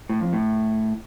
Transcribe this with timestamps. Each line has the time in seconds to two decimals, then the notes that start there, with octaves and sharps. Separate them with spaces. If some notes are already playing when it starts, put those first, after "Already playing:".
0.09 A2
0.21 F2
0.33 A2